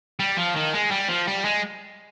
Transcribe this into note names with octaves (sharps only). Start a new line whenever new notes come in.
G3
F3
D#3
G#3
G3
F3
G3
G#3